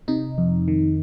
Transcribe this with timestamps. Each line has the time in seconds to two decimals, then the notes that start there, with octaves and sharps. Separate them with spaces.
0.08 C3 D#4
0.38 F2
0.68 D#3